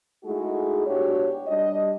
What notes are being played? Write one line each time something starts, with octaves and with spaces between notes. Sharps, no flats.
G#3 A3 D#4 E4 F#4 G#4
B2 D4 F#4 G4 C#5
G3 D4 D#5